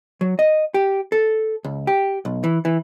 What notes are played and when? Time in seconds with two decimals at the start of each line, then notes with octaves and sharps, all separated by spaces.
0.21 F#3
0.39 D#5
0.74 G4
1.12 A4
1.64 C#2
1.87 G4
2.25 B1
2.44 E3
2.65 E3